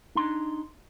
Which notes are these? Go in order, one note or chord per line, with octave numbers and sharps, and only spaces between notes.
D4 D#4 C6